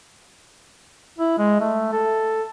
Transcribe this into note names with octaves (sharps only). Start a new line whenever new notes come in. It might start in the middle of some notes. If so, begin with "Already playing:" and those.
E4
G#3
A3
A4